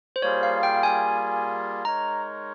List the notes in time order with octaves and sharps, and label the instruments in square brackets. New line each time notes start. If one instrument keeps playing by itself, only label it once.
[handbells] C5
[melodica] G3 A#3 F4 G#4 [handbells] C#5
[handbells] F5
G5
G#5
[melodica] G#3 D#4 A#4 C#5 [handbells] A#5